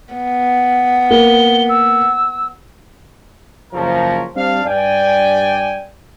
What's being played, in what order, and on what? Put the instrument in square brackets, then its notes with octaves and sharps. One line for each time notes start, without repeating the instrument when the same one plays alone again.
[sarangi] B3
[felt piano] A#3 [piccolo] G7
[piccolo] E6
[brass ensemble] F#1 F3 C#4 A#4
G3 C4 D4 C5 F5
G2 D5 G5 G#5